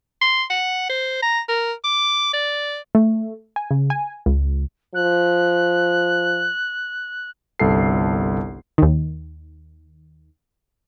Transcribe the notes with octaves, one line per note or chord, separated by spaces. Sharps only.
C6
F#5
C5
A#5
A#4
D6
D5
A3
G#5
C#3
G#5
C#2
F3 F#6
G1 C2 A4 C7
D#2 D#3